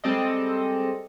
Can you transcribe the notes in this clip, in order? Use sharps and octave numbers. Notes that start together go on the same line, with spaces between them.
G3 G#3 C4 A4 D5 D#5